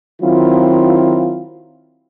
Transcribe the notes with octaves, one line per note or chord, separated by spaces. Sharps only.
D#3 F#3 C4 E4 F4